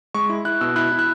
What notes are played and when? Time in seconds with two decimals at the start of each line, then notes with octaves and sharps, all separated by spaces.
0.14 G#3 C#6
0.29 E4
0.45 E4 F#6
0.61 B2 E6
0.76 E4 F#6
0.92 E4
0.99 F#6